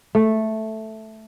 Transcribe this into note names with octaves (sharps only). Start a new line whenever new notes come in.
A3